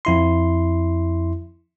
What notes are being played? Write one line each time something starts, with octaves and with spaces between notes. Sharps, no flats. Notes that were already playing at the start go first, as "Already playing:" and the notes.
F2 E4 C6